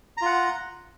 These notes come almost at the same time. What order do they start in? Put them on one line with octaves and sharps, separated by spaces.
A#5 F4 F#5